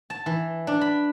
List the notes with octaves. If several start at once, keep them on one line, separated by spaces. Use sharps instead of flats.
A5
E3
D4
B5